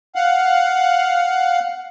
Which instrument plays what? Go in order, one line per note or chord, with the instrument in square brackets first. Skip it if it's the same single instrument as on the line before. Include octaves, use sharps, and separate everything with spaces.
[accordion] F5 F#5